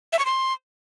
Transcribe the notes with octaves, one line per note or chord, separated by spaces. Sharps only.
E5
C#6
C6